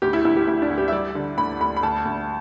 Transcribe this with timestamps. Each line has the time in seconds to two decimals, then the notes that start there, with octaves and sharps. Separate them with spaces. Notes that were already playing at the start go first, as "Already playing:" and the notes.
0.02 D2 G4
0.13 E4
0.25 D2 E4
0.36 G4
0.47 D2 E4
0.62 D4
0.70 D2
0.78 G4
0.88 E5
0.92 G3 D5
1.15 D3
1.38 D2 B5
1.61 D2 B5
1.76 B5
1.83 D2 A5
2.05 D2